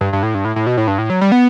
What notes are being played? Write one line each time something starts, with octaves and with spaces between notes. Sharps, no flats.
G2
G2
A2
G2
A2
A2
B2
A2
G2
A2
F#3
G3
B3